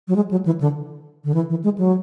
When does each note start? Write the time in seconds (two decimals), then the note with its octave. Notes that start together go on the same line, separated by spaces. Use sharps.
0.08 F#3
0.16 G#3
0.31 F#3
0.46 E3
0.61 D3
1.24 D3
1.34 E3
1.50 E3
1.64 G#3
1.78 F#3